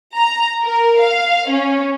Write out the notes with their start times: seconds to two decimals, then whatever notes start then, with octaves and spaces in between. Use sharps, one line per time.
0.16 A#5
0.63 A#4
1.00 F5
1.49 C#4